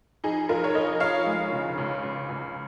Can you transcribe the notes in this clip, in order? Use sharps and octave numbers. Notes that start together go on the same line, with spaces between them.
F2 D#4 G#4
F2 F4 A#4
C#5
F2 A#4 D#5
F2 C#5 F5
G#3
C#3
C#2
C#2
C#2